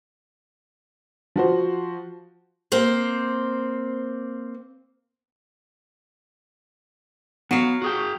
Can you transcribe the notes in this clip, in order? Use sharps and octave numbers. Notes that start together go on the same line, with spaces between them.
F3 F#4 C5
A#3 C4 C5
F#3 B3 F5
F#4 G#4 G5